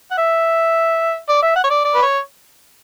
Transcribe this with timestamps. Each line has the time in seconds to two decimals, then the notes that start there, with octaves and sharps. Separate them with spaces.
0.11 F#5
0.18 E5
1.29 D5
1.43 E5
1.56 F#5
1.64 C#5
1.70 D5
1.85 D5
1.95 B4
2.02 C#5